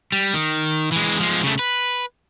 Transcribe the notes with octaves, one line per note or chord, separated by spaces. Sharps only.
G3
D#3
E3 G#3
F3 G#3
C#3 A3
B4